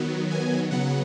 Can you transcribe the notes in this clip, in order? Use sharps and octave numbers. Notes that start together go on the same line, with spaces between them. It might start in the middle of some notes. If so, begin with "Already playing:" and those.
Already playing: D#3 F#3 B3
G#5
C#3 F#3 B3 F#5